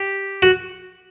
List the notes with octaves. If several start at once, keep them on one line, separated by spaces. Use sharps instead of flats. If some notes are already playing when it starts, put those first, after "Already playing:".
Already playing: G4
F#4